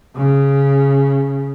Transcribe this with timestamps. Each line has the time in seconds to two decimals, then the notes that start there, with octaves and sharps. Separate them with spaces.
0.16 C#3